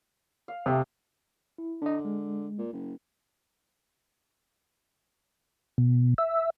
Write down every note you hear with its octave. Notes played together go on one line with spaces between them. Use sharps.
F5
C3 A3 G4 D#6
E4
D3 D4 D#5
G#3
A#2
F#1
B2
E5